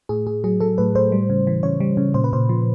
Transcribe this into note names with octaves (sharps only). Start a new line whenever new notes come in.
A2 G#4
A2 G#4
F#3 G#4
F#3 A4
A2 B4
A2 C5
G3
C#3
E3
C#3 C#5
G3
C#3
A#2 C5
B4
A#2 C5
F3